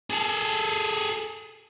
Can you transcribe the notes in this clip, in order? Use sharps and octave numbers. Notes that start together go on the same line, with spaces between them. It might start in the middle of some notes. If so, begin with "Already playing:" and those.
G#4 A4